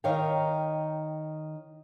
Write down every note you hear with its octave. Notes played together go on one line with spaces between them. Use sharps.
D#3 D#4 C#5 E5 F5 G5